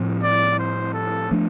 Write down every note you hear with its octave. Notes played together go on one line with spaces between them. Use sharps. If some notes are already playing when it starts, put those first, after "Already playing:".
Already playing: A2 F3 C4
D5
C5
A4
F3 A3 D4